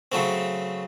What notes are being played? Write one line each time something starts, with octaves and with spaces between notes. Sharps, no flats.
C#3 F#3 A3 C4